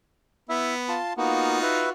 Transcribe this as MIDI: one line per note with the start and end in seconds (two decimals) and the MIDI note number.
0.49 0.97 59
0.49 0.74 64
0.49 0.74 76
0.89 1.13 65
0.89 1.13 81
0.89 1.13 84
1.17 1.60 58
1.17 1.60 59
1.17 1.93 63
1.17 1.93 65
1.17 1.93 66
1.63 1.90 71
1.63 1.90 76